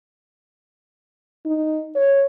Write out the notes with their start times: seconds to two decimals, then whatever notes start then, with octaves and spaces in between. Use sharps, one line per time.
1.46 D#4
1.95 C#5